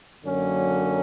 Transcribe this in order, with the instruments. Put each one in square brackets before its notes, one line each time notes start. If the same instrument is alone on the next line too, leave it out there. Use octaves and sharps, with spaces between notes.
[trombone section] F#2 D3 F#3 A#3 C#4